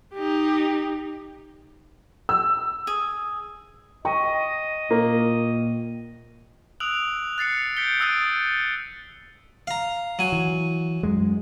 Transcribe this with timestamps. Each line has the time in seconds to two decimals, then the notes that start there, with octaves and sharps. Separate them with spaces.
0.14 D#4 G4
2.29 E6
2.87 G#4
4.05 D#5 G5 C#6
4.91 A#2 A#3
6.80 D#6 E6 F#6 D7 F7 F#7
7.38 F#6 A6 C7 C#7 F7
7.77 G6 B6 C#7 D7 G7
8.00 D#6 E6 F#6 A6 D7 D#7
9.67 F5 A#5
10.19 F#3 G#5
10.32 E3
11.03 F#2 G#3